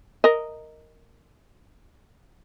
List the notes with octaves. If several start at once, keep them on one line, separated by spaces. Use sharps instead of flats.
A#4 D#5